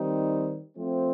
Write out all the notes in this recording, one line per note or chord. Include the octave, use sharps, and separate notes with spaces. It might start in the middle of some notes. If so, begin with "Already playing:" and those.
Already playing: D#3 G3 C4 D#4
F3 A3 C4